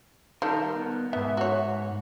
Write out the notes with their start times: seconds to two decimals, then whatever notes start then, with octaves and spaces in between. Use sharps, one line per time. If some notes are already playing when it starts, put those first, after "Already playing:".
0.42 D#3 G3 A4 A#4
0.75 B3
1.13 G#2 B3 E5
1.37 F#4 C#5